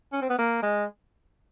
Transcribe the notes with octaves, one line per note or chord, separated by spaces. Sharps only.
C#4
C4
B3
A#3
G#3